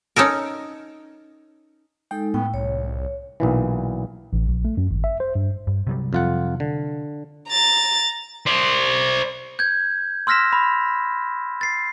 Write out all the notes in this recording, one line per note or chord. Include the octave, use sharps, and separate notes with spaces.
C#4 D#4 A4 A#4
G#3 D#4 A4 G5
A2 B3 G5
C2 C#5
B1 A#2 E3
A1
A#1
A3
F#2
G#1
E5
C5
G2
G2
C3 F#3 G3
F2 F4 F#5
D3
A#5 A6
C5 D5
G6 G#6
C6 E6 F6 A#6 B6 E7
B5
A6 C7